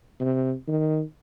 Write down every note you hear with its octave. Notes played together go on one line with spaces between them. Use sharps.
C3
D#3